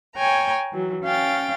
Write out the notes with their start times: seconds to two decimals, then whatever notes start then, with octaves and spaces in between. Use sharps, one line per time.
0.16 C#5 G5 G#5 A#5
0.72 E3 F#3
1.05 C#4 F5 G5 A6